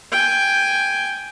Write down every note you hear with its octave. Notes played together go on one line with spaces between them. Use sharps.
G5 G#5